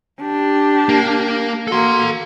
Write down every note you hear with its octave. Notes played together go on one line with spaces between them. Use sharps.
D4 G4
A#3
A#3 F#4 A4 C6